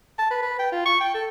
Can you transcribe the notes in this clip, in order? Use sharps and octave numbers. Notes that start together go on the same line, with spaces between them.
A5
B4
B4
G5
F4
C#6
G5
A4